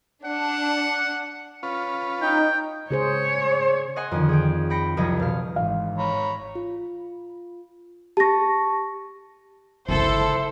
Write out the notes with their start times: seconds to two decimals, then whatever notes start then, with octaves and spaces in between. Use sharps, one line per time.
0.25 D4 F#5
1.63 C#4 F4 B4
2.22 D#4 G5
2.91 C#3 G#4 C5 C#5
3.96 D#5 F#5 G#5 C6
4.12 F2 D3 D#3
4.29 G#4 C#5 G5
4.70 G5 B5 A#6 C#7
4.97 F#1 C2 F2 F3 C#5 D#5
5.20 B2 F5
5.56 G#1 E3 F5
5.99 C#5 A#5 B5
6.55 F4
8.17 G4 A5 C#6 A#6
9.89 G1 C#2 E4 A4 C5